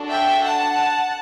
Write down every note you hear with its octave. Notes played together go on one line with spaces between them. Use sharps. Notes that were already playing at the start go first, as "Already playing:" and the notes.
Already playing: D4 F#4 A4
E5 G5
F#5 A5